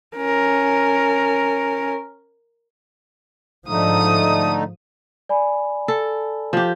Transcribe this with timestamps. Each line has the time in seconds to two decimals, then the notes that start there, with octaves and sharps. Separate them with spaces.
0.17 C#4 A#4
3.68 G#2 D3 F3 A3 D#4 D#6
5.29 D5 G#5 B5
5.88 A4
6.53 F3 G4